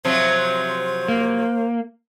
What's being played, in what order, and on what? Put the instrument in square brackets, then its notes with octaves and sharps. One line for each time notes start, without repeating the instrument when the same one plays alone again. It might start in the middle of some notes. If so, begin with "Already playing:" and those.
[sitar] C3 F3 F#3 [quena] C5
[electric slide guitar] A#3